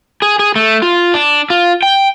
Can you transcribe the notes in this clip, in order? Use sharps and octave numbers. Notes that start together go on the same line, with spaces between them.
G#4
G#4
A3
F4
D4
F4
G5